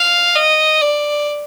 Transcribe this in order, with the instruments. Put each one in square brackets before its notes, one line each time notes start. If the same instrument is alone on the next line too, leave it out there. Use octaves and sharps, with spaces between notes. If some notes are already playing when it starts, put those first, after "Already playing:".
Already playing: [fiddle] F5
D#5
D5